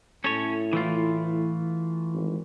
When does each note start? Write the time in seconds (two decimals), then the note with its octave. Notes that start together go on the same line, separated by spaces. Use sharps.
0.24 A2 C#4 A4 C#5
0.73 E3 A3 F4
2.13 G#1